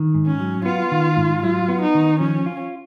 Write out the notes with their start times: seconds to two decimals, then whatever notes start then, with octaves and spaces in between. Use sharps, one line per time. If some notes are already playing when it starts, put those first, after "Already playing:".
Already playing: D#3
0.14 G#2
0.27 C#4
0.40 F#3
0.66 B3 F4
0.92 D#3
1.17 G#2
1.43 F#3 F4
1.68 B3
1.82 D#4
1.95 D#3
2.20 F3 C#4
2.46 F4